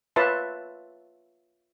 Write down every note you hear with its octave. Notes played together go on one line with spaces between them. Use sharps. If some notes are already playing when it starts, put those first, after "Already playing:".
F4 B4 C#5 E5 A5 C6